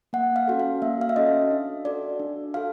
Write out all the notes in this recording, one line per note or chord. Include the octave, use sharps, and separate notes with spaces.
A#3 F#5
F5
C#4 F#4 A4
F5
A#3 E5
F5
E5
C#4 F#4 A4 D#5
D4
F#4 A4 D5
D4
F#4 A4 F5